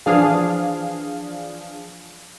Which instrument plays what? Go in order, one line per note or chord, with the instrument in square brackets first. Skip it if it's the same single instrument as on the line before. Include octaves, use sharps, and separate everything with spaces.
[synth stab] E3 F3 D4 G#4 F5